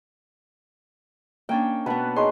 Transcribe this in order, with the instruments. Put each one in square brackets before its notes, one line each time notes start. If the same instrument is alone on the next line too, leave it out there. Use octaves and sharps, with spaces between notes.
[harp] A#3 C#4 D4 [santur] G5
[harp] B2 B3 [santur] B4 F#5 A5
[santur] D#4 G#4 C#5 [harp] C6